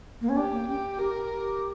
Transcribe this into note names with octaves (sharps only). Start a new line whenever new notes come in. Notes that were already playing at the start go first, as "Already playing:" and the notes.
A#3
C#4
D4 G4
A#3
C#4 G4
G4 A#4
G4